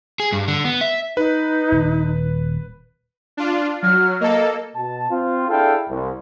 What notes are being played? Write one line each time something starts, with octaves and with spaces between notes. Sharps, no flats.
G#4
G2
D3
B3
E5
D#4 B4
D#1
D4 F4
F#3 F6
A#3 A4 D#5
B2 A5
C4 F4
D4 E4 G#4 A4 F5 G5
C2